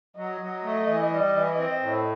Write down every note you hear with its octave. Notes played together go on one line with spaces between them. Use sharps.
F#3 D#5
F#3
A3
E3
G3
E3
C4
A2